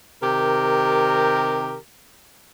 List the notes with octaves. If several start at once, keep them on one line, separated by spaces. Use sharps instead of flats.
C3 D#3 G4 A#4